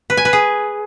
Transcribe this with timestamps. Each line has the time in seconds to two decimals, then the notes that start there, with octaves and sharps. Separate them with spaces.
0.10 B4
0.17 G#5
0.25 B4
0.33 G#4